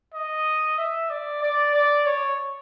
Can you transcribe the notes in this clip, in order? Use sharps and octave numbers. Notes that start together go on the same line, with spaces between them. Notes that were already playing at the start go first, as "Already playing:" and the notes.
D#5
E5
D5
D5
D5
C#5